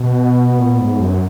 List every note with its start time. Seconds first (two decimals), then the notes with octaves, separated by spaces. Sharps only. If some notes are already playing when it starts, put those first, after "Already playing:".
Already playing: B2
0.18 B3
0.58 A#2
0.79 G#2
0.99 F#2